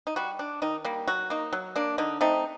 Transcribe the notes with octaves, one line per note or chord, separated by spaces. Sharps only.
D#4
G3 F#4
D4
D#3 D#4
G3 A#3
F#3 F#4
A#3 D#4
F#3
A#3 D4
D3 D#4
A3 C4 D#4